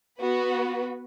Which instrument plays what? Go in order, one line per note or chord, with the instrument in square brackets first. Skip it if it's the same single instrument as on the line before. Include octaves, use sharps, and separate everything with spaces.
[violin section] B3 F#4 B4